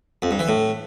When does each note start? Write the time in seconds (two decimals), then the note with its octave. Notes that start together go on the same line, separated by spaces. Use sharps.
0.22 F2
0.31 G2
0.39 E3
0.48 A2